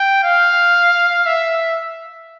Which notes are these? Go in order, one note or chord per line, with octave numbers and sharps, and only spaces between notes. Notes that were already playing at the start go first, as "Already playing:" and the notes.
Already playing: G5
F5
E5